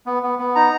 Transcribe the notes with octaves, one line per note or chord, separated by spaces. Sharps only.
B3
B3
B3
D#4 A#5